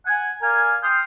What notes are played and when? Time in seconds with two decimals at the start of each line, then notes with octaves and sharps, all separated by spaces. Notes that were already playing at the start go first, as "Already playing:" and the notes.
0.06 F#5 G#5
0.42 A#4 D5 F5 G#5
0.82 G5 C6 D#6 F6